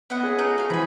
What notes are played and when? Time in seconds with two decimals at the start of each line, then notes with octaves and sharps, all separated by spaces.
0.10 B3 E4 D#5 F#5
0.23 C#2 G#4
0.38 A3 C#4 A#5
0.58 A3 F#4 F5
0.70 E3 C4 G#5 A#5 B5